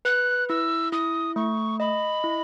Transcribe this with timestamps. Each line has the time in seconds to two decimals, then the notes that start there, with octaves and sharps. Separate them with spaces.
0.05 B4 F#6
0.49 E4 E6
0.92 E4 D#6
1.36 A3 C#6
1.80 D#5 B5
2.24 E4